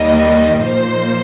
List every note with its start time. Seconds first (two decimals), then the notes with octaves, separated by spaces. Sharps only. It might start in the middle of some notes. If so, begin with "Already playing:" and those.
Already playing: D#2 D#3 G3 A#3 D#5
0.60 A#2 F3 A#3 D#4 C5